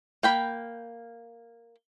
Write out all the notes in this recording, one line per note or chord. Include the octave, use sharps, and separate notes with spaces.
A#3 G5 B5